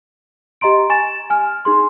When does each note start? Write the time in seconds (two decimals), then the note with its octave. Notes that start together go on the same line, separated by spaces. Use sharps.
0.61 G4 D#5 A#5 C6 D7
0.90 G#5 C#6 A6 E7
1.30 G#5 F6
1.65 D#4 G#4 C6